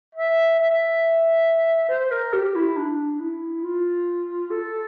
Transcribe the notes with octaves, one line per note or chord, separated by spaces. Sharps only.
E5
E5
C5
A#4
G4
E4
D4
E4
F4
A4